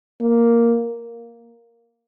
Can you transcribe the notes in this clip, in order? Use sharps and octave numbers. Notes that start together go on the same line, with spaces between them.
A#3